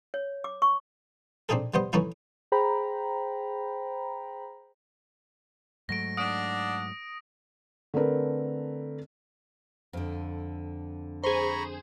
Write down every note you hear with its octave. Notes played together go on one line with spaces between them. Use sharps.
C#5
D6
C#6
C4 D4 D#4 G#4 A4
G3 B3 C5 D#5
E3 A3 C#4 D#4 E4
G#4 C5 G5 A#5 B5
G#2 F#3 A3 A#6 D7
D4 D5 F#5 D#6 D7
D3 A3 C4 A#4 B4
F2 D3
G#4 C5 A#5 B5 C#6